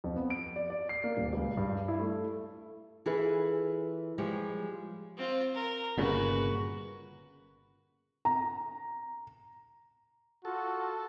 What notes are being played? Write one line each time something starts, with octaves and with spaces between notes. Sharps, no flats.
F2
B3
D7
D5
D5
C7
A#3
D#1
C#2
G2
E4
A3
E3 F4 G#4 A4 B4
F3 G3 G#3 C#5
C4 F4
A#4
G1 A#2 C#3 F#4 B4
A#5
F4 F#4 A4